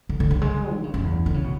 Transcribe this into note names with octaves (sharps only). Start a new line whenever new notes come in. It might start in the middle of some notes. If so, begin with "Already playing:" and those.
D3
D3
F#3
G#3
D3
C#3
F#2
E2
D3
C#3
B2